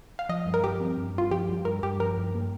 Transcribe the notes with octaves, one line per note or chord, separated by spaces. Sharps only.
F5
F3 D#5
G2
A#4
F3 G4
C4
G2
G2 F4
F3 G4
G2
G2 A#4
G2 G4
F3 A#4
G2
A#3